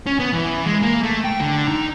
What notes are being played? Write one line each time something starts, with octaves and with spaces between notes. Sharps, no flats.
C#4
B3
E3
G#3
A#3
A3
G5
D3
D#4